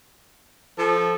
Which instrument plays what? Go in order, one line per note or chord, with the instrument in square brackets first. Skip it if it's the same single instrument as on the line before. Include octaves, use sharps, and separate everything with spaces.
[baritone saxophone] F3 [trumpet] A4